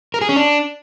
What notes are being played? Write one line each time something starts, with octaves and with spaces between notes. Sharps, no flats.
A#4
G#4
C#4
D4